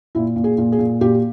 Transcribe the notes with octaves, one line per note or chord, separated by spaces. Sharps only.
A#2 E4
A#2
G#4
A#2
G#4
A#2
A#2 G4